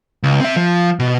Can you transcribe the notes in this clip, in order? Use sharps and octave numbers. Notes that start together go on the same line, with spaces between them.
C#2
C4 E5
F3
B2